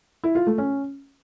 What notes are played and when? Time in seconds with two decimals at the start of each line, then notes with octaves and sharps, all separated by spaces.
0.24 E4
0.35 F4
0.47 A3
0.58 C#4